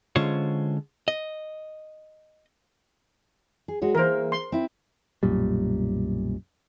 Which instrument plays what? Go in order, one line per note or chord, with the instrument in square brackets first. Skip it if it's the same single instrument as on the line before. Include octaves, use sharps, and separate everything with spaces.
[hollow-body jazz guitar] D3 G#3 C#4 F4 C5 C#5
D#5
[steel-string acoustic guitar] G#4
G#3 F#4 C#5
[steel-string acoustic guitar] E3 A#3 [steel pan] A#4 C5
[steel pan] C6
[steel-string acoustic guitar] C4 E4
[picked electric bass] B1 F#2 A#2 G3